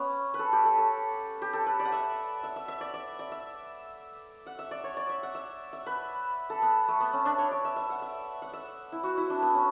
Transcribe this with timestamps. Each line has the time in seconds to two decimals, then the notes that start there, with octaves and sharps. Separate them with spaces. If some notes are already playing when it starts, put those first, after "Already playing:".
Already playing: B3 C#4
0.34 B4
0.39 A4
0.53 G4
0.65 A4
0.77 A4
1.42 G4
1.53 A4
1.67 B4
1.79 D5
1.85 F#5
1.92 E5
2.43 E5
2.56 E5
2.68 E5
2.81 D5
2.94 D5
3.19 D5
3.32 E5
4.46 F#5
4.59 E5
4.71 D5
4.84 C#5
4.97 D5
5.09 E5
5.23 F#5
5.35 E5
5.73 E5
5.86 B4
6.50 A4
6.62 B3
6.88 A3
7.00 B3
7.13 C#4
7.26 D4
7.38 C#5
7.51 D5
7.65 E5
7.76 E5
7.90 F#5
8.02 E5
8.42 F#5
8.54 E5
8.92 E4
9.03 F#4
9.17 E4
9.30 D4
9.42 B3
9.55 C#4